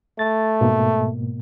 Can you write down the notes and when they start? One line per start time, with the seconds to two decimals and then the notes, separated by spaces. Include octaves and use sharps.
0.19 A3 A6
0.61 G#2 B2 A#3